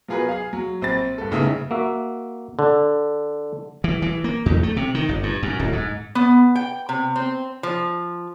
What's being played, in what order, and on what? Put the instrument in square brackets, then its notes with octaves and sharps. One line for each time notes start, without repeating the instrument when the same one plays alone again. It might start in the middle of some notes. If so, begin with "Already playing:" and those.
[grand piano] F#3 B3 F4 G#4 A#4 B4
G#4 F5
F#3
A#1 C4 B5 A6
G2 A4
F#1 A2 C#3 B3 D#4 E5
[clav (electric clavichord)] A#3 F#4 E5
D3
[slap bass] E3
E3
A#3
E2
A3
C3
D#3
G1
G2
F#2
D1
G#2
[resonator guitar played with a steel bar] B3
G5
C3
C4
F3